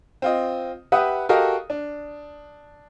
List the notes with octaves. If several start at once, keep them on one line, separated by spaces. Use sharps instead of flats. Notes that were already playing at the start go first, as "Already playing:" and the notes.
C4 F4 D#5
G4 B4 E5 F#5 D#6
F#4 G4 A4 A#4 D#5 F5
D4